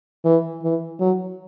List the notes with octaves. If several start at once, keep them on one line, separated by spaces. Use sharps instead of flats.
E3
E3
F#3